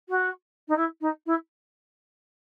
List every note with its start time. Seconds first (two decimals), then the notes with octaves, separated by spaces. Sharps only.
0.09 F#4
0.68 D#4
0.77 E4
1.01 D#4
1.26 E4